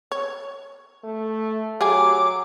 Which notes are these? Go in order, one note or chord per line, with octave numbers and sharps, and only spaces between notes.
C#5
A3
F#3 G4 G#4 G#5 D6